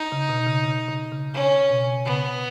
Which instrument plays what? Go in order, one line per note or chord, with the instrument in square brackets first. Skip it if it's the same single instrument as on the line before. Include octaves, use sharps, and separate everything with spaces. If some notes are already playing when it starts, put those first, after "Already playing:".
Already playing: [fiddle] D#4
[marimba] C#3
B2
C#3
C#3
C#3
C#3
[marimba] C#3 [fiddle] C#4
[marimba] B2
[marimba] C#3 [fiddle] B3